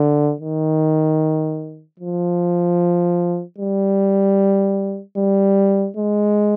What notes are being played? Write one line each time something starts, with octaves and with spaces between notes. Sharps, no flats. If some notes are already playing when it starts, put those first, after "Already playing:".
Already playing: D3
D#3
F3
G3
G3
G#3